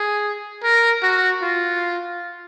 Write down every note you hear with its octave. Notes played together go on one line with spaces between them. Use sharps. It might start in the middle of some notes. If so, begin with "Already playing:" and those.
Already playing: G#4
A#4
F#4
F4